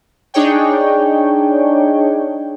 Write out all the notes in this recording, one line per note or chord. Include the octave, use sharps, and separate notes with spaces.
D4 D#4 G#4 C#5 G5